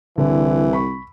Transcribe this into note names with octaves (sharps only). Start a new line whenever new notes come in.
C2 D3 E3
B5 C#6